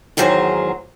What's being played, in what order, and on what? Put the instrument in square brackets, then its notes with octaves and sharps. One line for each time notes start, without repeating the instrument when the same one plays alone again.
[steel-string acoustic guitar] E2 G#2 D#3 F#3 G#4 C5